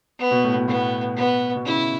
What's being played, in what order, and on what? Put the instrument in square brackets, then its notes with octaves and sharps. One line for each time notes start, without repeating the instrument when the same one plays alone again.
[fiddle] B3
[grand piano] B2
A2
B2
[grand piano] A2 [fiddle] B3
[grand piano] B2 [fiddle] B3
[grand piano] B2
[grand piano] C#3 [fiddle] E4